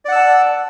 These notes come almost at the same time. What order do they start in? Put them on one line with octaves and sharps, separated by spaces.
D5 F#5 E6 A5